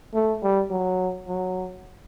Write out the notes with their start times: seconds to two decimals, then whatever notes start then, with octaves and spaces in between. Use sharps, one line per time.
0.14 A3
0.43 G3
0.71 F#3
1.28 F#3